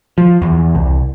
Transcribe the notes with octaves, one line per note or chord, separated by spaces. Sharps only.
F3
E2
C2